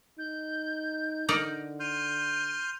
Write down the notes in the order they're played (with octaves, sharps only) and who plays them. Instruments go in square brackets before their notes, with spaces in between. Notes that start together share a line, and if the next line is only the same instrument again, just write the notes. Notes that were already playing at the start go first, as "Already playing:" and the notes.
[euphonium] D#4 [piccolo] G6
[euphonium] D3 [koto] D#4 A#4 D5
[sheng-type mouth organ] C6 F6 G6 [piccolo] D#7